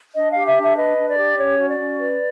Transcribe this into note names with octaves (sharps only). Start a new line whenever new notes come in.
D4 D#5
G4 F5
E5
D4 E5
B4 D#5
D4
D5
G4
C#4 C#5
F#4
D5
C#4
B4